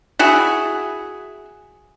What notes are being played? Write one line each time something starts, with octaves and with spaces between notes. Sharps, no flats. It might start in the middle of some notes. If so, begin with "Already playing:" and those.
E4 F#4 G#4